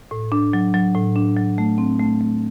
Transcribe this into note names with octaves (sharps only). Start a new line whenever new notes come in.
A2
D4
F#3
F#3
A2
D4
F#3
A3
C4
A3
A3